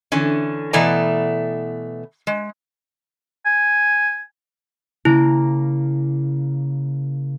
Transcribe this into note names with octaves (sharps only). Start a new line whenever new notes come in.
D3 E3 C#4
B2 E3 A3 B3 D5 A#5
G#3
G#5
C#3 A#3 E4 A#5